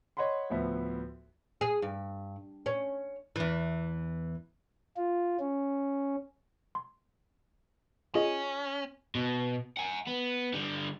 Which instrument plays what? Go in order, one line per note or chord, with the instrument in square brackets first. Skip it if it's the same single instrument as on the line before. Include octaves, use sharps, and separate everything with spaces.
[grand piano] C#5 D#5 F#5 B5 C6
D2 A2 F3 B3 E5
[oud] G#4
G2
C#4
E2 E3
[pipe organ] F4
C#4
[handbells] C6
[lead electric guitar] C#4 [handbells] F4 G#4 D#5
[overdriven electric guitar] B2
F#5 G#5
B3
D3 G3